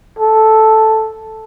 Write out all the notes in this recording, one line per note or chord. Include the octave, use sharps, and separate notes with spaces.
A4